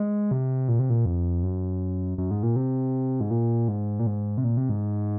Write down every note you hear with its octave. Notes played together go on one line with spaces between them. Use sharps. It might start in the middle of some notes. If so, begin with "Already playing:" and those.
Already playing: G#3
C3
A#2
C3
A#2
F2
F#2
F#2
G#2
A#2
C3
G#2
A#2
G#2
A#2
G#2
C3
A#2
C3
G#2